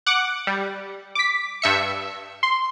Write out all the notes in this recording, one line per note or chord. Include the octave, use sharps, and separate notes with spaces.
F#5 D6
G3
D6 B6
G2 E5 C#7
C6